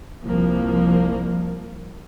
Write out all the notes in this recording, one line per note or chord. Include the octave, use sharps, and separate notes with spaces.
C2 F3 A#3